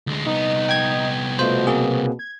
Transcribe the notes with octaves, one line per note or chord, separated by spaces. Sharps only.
D2 G#3
C2 B3 D#4
G5 G#6
B2 A3 F4 C5
A#3 C4 G#4
G#6